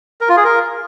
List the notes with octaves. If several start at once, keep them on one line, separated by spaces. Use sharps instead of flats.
A#4
F4
G#4
A#4